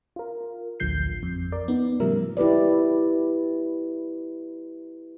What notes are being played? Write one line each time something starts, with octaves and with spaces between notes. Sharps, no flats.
F4 A#4
A1 D2 D3 F3 G6 C7
F2
A#4 D5
B3 D#4
A2 C#3 F3 G3 A#4 E5
E4 G4 B4 D5